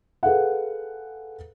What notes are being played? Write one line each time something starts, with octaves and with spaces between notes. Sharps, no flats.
G#4 A4 B4 F5 F#5